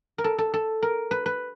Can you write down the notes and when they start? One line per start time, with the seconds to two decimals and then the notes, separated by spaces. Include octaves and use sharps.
0.18 A#4
0.24 A4
0.38 A4
0.54 A4
0.82 A#4
1.11 B4
1.26 B4